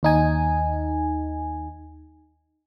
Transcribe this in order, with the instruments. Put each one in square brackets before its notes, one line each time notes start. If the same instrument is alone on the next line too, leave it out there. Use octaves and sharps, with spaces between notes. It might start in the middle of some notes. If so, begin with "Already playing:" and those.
[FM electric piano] D#2 D#4 G#5